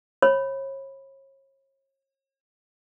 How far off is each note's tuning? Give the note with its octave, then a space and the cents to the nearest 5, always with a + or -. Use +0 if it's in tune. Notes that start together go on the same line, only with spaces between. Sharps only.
C#5 -35 B5 +0